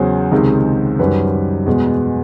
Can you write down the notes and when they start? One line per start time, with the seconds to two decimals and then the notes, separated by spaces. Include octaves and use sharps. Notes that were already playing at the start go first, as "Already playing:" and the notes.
Already playing: E2 C#3 F#3 C5
0.31 C#2 C3 D#3 G#3
0.99 F#2 D#3 G3 B4
1.66 E2 B2 G#3